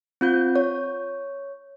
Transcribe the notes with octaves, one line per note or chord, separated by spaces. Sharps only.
C4 F4 G6
C#5